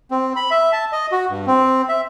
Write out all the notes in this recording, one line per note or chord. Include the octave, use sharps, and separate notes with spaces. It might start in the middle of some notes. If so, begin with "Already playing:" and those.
C4
B5
E5
A5
D#5
F#4
G2
C4
E5